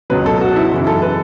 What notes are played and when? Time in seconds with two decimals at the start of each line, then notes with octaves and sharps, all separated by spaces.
0.10 C#2 B2 F#3 B4
0.26 A4
0.41 F#4
0.56 E4
0.72 F#2 C#3 E3
0.87 A4
1.02 B4